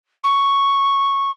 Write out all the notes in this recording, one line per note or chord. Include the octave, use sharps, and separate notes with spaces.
C#6